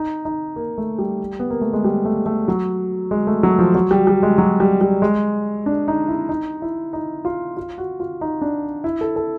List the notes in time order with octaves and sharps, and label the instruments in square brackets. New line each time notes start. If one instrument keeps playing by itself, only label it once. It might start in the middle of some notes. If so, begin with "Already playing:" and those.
Already playing: [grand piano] D#4
D#4
A#3
A3
G3
B3
A#3
A3
G#3
G3
A3
A3
F#3
G#3
A3
F#3
F3
F#3
G3
G3
G#3
F#3
G3
G3
G#3
D4
D#4
E4
D#4
E4
D#4
F4
F4
F#4
F4
D#4
D4
E4
A4
A4